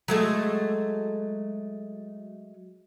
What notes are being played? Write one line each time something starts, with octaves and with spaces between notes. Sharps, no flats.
F#3 G#3 A3